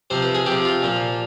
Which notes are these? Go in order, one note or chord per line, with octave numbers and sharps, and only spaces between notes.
C3 F3 C5
B4
G#4
C3 F3 G4
F4
A#2 F3